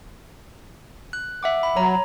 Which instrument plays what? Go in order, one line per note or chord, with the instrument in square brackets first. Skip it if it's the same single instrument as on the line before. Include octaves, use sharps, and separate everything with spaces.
[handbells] F#6
E5 F#5 D6
B5
[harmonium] F#3 [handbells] C#5 A#5